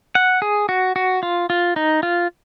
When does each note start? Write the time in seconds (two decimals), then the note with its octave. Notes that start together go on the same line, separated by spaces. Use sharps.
0.15 F#5
0.42 G#4
0.69 F#4
0.96 F#4
1.23 F4
1.50 F4
1.76 D#4
2.03 F4